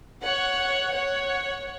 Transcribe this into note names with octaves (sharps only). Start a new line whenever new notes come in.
C#5 F#5
C#5 F#5